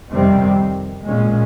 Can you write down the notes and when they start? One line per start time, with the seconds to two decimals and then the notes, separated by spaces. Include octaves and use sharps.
0.10 F2 C3 D#3 G3 C4
1.04 A#2 G#3 C#4